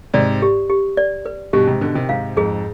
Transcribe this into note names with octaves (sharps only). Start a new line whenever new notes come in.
G#2 C3 D5
G4
G4
D5
B4
G2 B2 G4
G#2 C3
B2 D3 B4
C3 D#3
G#2 C3 F5
F2 G#2 G#4